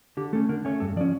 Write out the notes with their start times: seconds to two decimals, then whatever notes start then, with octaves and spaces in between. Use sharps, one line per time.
0.17 D3 G4
0.33 A3 C#4 A4
0.49 D3 A#4
0.65 A3 C#4 C#5
0.80 G2 A4
0.96 F3 D5
1.01 C#4